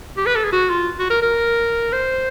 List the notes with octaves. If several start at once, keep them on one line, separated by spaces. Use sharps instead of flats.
G4
B4
A4
G#4
F#4
F4
F#4
A#4
A#4
C5